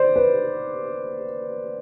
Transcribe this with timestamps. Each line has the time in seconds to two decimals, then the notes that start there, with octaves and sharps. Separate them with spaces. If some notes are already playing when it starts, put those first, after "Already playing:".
Already playing: C5 D5
0.16 B4